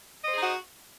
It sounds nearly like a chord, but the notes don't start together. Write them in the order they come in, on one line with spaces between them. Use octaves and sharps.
D#5 C5 G#4 D#4 F#4